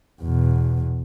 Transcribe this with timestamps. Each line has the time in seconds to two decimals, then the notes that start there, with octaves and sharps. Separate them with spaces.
0.22 E2 B2